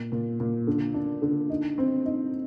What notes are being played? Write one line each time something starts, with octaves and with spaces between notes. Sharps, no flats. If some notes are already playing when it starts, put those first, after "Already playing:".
Already playing: A#2
A#2
A#2
D3
D4
D3
D#4
C4
D#4